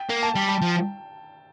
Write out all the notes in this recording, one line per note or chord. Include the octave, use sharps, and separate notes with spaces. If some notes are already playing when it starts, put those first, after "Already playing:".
Already playing: G5
A#3
A5
G3 G5
A5
F3